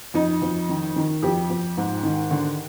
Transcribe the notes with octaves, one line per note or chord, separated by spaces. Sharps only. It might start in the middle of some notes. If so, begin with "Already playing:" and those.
F2 D#4
F2
D#3
D#3
F2 G4
F2
G#2
D#3
D3